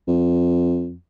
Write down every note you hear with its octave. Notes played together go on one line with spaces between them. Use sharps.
F2